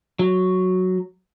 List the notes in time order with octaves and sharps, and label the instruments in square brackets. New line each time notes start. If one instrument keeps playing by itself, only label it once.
[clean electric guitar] F#3